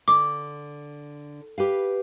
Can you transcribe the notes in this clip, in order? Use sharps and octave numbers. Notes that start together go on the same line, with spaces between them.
D3 D6
G4 B4 F5